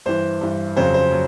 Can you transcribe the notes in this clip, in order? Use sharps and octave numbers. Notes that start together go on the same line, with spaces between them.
G2 E3 C5
G2 E3
F2 C#3 F#3 C5
C5
F#3